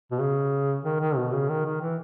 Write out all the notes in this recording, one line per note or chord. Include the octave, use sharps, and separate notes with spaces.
B2
C#3
D#3
D#3
B2
C#3
D#3
D#3
E3